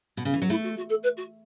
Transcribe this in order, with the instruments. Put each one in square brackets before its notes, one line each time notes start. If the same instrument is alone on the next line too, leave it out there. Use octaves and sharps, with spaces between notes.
[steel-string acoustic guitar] B2
C#3
E3
F#3
[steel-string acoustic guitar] A3 [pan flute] E4
[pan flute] F#4
F#4
A4
B4
F#4